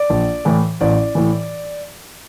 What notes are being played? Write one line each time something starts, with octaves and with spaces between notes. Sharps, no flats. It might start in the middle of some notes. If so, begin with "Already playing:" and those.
Already playing: D5
A#1
A2 E3
A1 D5
A2 E3